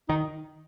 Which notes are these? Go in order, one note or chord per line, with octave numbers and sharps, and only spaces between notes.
D#3 D#4